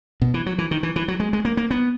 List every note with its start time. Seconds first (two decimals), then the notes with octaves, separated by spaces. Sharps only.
0.22 B2
0.34 E3
0.46 F#3
0.58 E3
0.71 D#3
0.83 E3
0.96 E3
1.08 F#3
1.20 G#3
1.33 G#3
1.45 A#3
1.57 A#3
1.71 B3